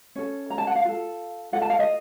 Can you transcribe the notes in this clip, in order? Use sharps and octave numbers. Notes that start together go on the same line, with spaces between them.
C#4 A4
A#5
A5
F#5
F5
F4 A4
F4 A4 F#5
A5
F5
D#5